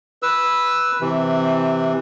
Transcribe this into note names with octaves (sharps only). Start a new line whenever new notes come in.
B4 E6
C3 E3